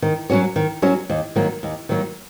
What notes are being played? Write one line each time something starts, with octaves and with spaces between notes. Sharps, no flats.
D#3
F#3 C#4 F#4 C#5
D#3
F#3 C#4 F#4 C#5
D#2
D#3 F#3 A#3
D#2
D#3 F#3 A#3